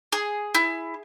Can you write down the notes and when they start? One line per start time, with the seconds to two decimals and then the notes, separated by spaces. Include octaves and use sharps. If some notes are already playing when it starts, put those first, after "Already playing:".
0.12 G#4
0.55 E4